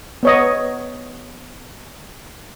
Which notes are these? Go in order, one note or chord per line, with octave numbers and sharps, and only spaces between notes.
B3 C#5 D#5